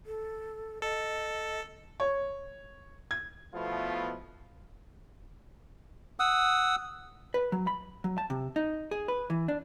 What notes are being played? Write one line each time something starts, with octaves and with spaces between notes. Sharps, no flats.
A4
A4 D#5
C#5
G#6
B2 F3 A3 B3 E4 F4
F#5 D#6 E6
B4
F#3
B5
F#3
A5
C3
D#4
G#4
B4
E3
D4